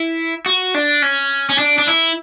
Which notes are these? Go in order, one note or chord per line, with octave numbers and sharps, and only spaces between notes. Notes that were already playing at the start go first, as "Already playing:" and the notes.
Already playing: E4
F#4
D4
C#4
C#4
D4
D4
E4